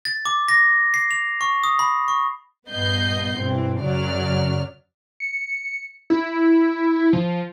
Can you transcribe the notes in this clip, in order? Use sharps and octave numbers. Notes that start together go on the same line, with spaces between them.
A6
D6
A#6
C7
F7
C#6
D#6
B5
C#6
A#1 G2 B3 D#5 G6 C7
G2 B2 E3 C4
F#2 C#3 F#3 D5 F6
C#7
E4
F3